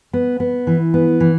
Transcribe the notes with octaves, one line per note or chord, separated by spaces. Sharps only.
B3
B3
E3
B3
E3